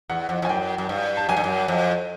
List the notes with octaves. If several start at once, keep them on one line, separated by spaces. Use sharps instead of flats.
E2 F#5
F2
F2
G#5
F#2 G5
F#2
G2
A5
F#2 G#5
G2
F#2
F2